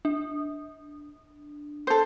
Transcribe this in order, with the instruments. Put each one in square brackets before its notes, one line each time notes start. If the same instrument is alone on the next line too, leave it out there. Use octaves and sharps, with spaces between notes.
[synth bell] D4
[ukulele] A4 C5